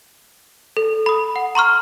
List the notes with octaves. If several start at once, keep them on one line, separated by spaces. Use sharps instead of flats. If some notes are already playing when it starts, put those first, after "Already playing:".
A4
B5 D#6
F#5
A#5 C6 C#6 F6